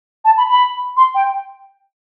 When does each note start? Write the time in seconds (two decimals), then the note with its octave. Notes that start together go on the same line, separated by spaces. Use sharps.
0.25 A5
0.38 B5
0.49 B5
0.97 C6
1.15 G5